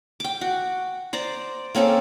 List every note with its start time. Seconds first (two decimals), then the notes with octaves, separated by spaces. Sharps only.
0.20 G5 D6
0.41 F#4
1.13 C5 D5 A#5
1.75 A#3 C4 C#4 A4